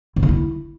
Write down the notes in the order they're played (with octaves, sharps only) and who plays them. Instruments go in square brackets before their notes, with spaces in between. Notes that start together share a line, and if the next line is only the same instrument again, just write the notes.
[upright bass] E3
D#3
E4